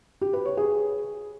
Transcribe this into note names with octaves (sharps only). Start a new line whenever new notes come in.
G4
B4
C#5
G#4